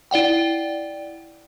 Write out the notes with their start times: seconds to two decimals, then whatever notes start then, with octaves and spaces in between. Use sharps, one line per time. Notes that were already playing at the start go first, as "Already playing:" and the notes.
0.11 E4 D5 F#5 G5